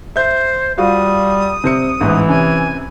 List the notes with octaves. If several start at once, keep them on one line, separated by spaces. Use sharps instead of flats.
C5 E5 G6
G3 F4 F#4 F5 D#6
C3 C4 C#7
A1 G#2 E3
C3 C#4 G#5